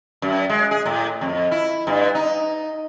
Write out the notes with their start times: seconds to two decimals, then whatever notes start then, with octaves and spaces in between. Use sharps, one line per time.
0.22 F#2
0.50 G#3
0.71 G#4
0.86 A2
1.21 F2
1.52 E4
1.87 G2
2.15 D#4